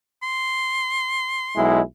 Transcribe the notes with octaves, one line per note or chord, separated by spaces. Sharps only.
C6
B1 G#3 E4